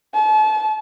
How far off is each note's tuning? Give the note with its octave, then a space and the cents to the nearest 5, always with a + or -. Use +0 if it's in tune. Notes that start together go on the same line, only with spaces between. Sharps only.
A5 -35